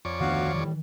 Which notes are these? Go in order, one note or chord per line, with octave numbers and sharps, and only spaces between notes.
F2 C#5 D5
D2 D#3 B3 D4 F#4 F5
A2 D#3 E3 G3